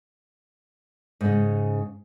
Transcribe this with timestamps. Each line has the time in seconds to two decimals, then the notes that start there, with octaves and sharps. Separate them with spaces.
1.21 G#2 C#3